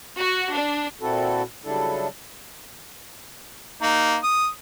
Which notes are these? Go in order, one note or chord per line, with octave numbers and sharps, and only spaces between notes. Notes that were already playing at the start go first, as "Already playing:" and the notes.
F#4
D4
A#2 C4 E4 F#4 A4
C#3 F#3 G3 D4 E4 A4
A#3 D#4
D#6